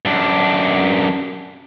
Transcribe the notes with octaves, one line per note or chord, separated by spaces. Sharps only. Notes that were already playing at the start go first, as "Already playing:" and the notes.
F#2 D4